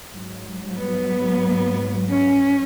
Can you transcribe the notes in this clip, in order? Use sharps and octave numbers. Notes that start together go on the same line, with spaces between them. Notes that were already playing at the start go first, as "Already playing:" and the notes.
G#2 F#3
B3
C#4